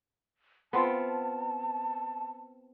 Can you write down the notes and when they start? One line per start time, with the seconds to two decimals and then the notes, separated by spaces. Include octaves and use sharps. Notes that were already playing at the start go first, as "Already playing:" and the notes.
0.73 B3 C4 F4 A5